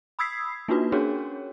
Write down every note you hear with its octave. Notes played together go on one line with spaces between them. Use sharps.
B5 D#6 E6 G#6 B6 C7
A#3 D4 D#4 F4 F#4 B4
C#4 D4 F#4 G#4 A#4 C#5